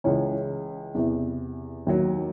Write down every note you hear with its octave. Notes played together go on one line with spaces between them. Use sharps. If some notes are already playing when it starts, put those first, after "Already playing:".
C#2 C#3 E3 C#4 C#5
E2 C3 E3
D#2 D#3 F#3